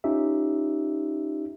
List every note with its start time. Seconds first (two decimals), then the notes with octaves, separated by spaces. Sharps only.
0.04 C#4 D#4 F4 G4 E5